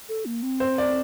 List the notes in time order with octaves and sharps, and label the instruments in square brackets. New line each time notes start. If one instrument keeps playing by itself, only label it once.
[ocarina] A4
A#3
C4
[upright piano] C5
D5